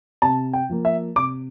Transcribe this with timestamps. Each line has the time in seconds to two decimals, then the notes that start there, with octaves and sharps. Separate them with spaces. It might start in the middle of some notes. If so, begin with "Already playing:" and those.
0.22 C3 A5
0.53 G5
0.70 F3 A#3
0.85 E5
1.16 C3 D6